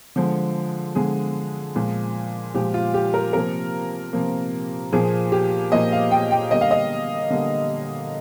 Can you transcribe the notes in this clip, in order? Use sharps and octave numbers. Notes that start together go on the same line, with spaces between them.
D3 F3 G#3
D3 F3 G#3 G#4
A#2 F3 G#3
A#2 F3 G#3 G4
F4
G4
A#4
C3 F3 A#3 A#4
C3 F3 A#3
A#2 F3 A#3 G#4
G4
A#2 F3 A#3 D#5
F5
G5
G5
D3 G3 A#3 D#5
F5
D#5
D3 G3 A#3